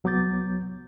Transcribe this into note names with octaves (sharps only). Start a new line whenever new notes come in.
C2 F#3 B3 D6 G6 A6